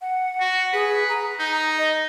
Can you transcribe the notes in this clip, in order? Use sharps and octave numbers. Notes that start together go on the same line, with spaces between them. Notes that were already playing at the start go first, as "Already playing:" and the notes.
F#5
F#4
G#4 B4
A#5
D#4
D#5